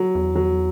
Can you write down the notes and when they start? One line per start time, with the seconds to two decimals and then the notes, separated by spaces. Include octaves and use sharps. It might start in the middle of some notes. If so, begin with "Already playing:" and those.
Already playing: F#3
0.15 E2
0.35 F#3